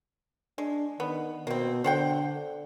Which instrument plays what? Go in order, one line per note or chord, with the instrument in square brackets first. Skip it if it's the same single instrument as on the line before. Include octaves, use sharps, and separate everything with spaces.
[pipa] G#3 [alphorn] D4
[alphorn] D#3 [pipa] B3
[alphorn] B2 [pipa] A#3 C4
[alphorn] D3 [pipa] C5 F#5 G5